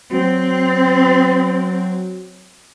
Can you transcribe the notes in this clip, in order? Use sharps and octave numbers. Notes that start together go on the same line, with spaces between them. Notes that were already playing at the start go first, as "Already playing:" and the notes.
F#3 C4